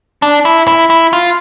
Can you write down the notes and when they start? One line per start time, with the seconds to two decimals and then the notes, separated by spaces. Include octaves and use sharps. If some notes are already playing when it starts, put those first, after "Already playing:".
0.22 D4
0.45 E4
0.68 E4
0.90 E4
1.13 F4